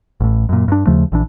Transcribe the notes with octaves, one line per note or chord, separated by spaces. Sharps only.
A1 A2
F#2 A#2
G2 D4
D#2 C#3 F3 A3
A#1 E3 D4